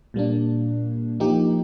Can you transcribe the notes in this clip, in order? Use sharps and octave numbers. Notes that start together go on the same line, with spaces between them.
A#2 G3 A#3 D4
F3 A#3 D#4 G4